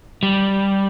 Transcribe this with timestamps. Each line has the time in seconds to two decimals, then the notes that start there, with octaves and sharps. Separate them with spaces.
0.23 G3